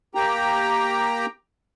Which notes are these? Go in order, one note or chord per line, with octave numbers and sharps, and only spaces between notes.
A#3 G4 G5 A#5